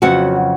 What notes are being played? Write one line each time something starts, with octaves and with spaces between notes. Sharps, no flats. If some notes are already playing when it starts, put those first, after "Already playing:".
F2 C#3 F#3 B3 F#4 F#5